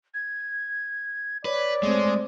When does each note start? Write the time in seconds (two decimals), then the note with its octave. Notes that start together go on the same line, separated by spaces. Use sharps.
0.14 G#6
1.45 B4 C#5 D5
1.83 G#3 A3 C4